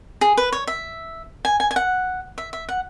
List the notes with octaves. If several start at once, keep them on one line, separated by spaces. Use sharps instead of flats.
G#4
B4
C#5
E5
G#5
G#5
G#5
F#5
E5
E5
F#5